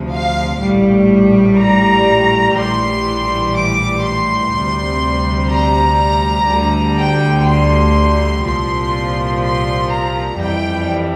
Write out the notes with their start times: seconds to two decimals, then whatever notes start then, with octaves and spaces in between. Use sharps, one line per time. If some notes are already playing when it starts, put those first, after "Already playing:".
Already playing: D2 C3 F3
0.12 F5
0.61 A#1 A2 G3
1.59 A#5
2.56 A#1 A2 E3 G3 C6
3.55 D6
4.03 C6
4.52 D2 C3 G3
5.50 A#5
6.48 D2 D3 G3
6.96 G5
7.45 C6
8.43 C2 A#2 F3 C6
9.41 C6
9.90 A#5
10.38 F2 E3 G3 G5